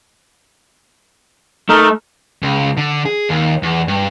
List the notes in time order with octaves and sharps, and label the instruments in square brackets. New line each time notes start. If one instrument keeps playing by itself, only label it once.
[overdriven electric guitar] A3 [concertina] D#4 A#4
[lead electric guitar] C#2
D3
G#4
D#2
E2
G2